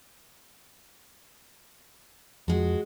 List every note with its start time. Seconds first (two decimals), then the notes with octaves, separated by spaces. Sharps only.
2.48 F2 F3 G#3 F#4